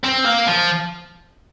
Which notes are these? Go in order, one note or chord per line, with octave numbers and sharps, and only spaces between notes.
C4
A#3
F3